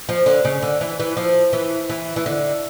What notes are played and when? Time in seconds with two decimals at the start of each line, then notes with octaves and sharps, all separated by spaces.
0.09 F3
0.26 D3
0.45 C#3
0.62 D3
0.81 E3
0.99 E3
1.17 F3
1.53 E3
1.89 E3
2.16 E3
2.26 D3